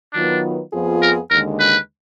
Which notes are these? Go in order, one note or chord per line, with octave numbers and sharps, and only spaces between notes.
D#3 F#3 B3 D4 F4 B4
F2 F3 B3 F4 G#4
A#4
D#2 D3 G#3 A#4
B4